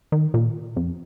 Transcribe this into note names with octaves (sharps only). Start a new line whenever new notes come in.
D#3
A#2
F2